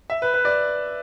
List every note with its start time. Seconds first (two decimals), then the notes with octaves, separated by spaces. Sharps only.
0.10 E5
0.22 B4
0.34 B4
0.45 D5